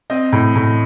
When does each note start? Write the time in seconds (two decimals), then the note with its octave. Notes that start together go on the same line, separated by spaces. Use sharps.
0.10 C4 D#5
0.33 A2
0.56 A2